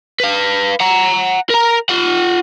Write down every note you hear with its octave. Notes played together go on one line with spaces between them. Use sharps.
B4 F5
F#5 A#5
A#4 A#5
F4 F#5